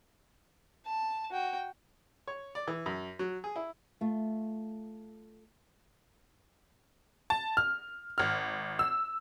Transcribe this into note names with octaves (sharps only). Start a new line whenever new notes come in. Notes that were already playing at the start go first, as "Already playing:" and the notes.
A5
F#4 G5
C#5
D5
E3
F#2
F#3
G#4
E4
A3 F4
A5
F6
G#1 F6
E6